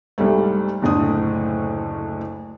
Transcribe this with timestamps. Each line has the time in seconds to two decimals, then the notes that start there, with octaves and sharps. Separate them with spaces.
0.18 C2 G#2 G3 A3
0.82 F#1 D2 A2 D4 D#6